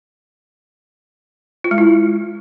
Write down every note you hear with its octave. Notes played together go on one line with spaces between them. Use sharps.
F4
G#3
E4